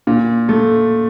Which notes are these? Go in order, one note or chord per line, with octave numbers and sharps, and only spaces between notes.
A#2
A3